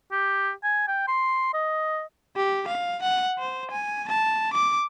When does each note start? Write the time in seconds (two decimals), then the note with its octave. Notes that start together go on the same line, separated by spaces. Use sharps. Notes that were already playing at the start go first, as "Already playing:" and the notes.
0.11 G4
0.63 G#5
0.88 G5
1.08 C6
1.54 D#5
2.36 G4
2.67 F5
3.02 F#5
3.38 C5
3.71 G#5
4.08 A5
4.53 D6